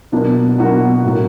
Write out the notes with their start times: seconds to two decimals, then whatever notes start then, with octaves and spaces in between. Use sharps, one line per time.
0.12 B2 F#3 A#3 D4 F#4
0.58 B2 F#3 A#3 D4 F#4
1.04 A2 F#3 A#3